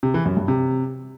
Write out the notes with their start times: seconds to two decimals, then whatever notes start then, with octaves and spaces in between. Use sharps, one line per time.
0.03 C3
0.14 E3
0.25 F#2
0.37 G2
0.48 C3